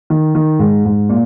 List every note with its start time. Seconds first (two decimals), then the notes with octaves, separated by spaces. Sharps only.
0.10 D#3
0.35 D#3
0.59 G#2
0.85 G#2
1.09 A#2